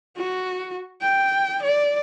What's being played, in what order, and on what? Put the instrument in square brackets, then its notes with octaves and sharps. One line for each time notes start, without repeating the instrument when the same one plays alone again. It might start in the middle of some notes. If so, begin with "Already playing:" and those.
[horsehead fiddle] F#4
G5
D5